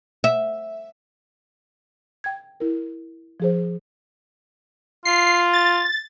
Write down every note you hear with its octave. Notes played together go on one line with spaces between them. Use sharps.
E5
G5 G#6
E4 A#4
F3 G#4 C5
F4 C7
A6